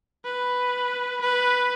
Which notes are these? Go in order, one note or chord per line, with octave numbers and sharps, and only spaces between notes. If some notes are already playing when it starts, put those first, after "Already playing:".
B4
B4